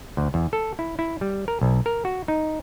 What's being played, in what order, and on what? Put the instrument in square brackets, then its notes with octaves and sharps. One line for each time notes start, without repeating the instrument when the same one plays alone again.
[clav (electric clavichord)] D2
E2
A4
E4
E4
G3
A#4
B1
A#4
F#4
D#4